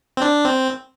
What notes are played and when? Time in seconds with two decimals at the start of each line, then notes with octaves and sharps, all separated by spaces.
0.17 C4
0.22 D4
0.45 C4